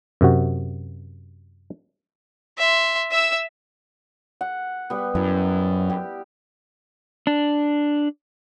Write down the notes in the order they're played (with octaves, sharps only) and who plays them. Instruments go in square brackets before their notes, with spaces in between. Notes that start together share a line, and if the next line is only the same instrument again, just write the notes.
[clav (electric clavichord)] F#2 C3 F#4
[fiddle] E5 C6
E5 E6
[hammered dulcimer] F#5
G3 B3
[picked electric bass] F#2 [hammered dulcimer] E4
[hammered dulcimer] G4
[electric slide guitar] D4